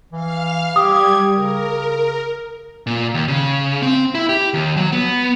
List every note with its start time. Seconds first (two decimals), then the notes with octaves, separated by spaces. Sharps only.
0.12 E3 F5 F6
0.76 G3 G4 D#6 G#6
1.33 C#3 A#4
2.87 A#2
3.14 D#2
3.28 C#3
3.82 C4
4.15 E4
4.29 G4
4.54 D#2
4.77 F#3
4.92 B3